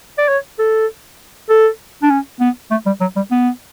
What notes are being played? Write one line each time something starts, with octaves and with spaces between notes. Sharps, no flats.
D5
C#5
A4
A4
D4
C#4
B3
A3
G3
F#3
G3
B3